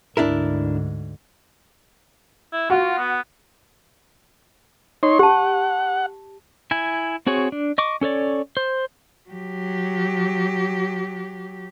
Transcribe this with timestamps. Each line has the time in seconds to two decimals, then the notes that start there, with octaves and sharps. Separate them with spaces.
0.17 D2 G#2 D4 E4 A#4
2.53 E4
2.70 F4 F#4
2.98 B3
5.03 D#4 C#5 C6
5.19 G4 F#5 A5
6.71 E4 G#5
7.27 C4 F#4 G#4 C#5
7.52 D4
7.78 D#5 C#6 D6
8.01 C#4 A4 C#5 D5
8.57 C5
9.30 F#3 G4